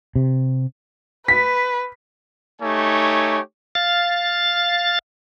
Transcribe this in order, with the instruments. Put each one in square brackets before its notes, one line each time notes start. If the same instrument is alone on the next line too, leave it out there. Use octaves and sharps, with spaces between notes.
[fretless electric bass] C3
[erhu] B4 [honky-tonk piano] B6
[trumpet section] A3 D#4 G4 C#5 G#5
[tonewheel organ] F5 A6